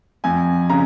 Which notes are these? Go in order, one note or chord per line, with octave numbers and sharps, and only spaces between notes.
F2 G#5
C#3 A#5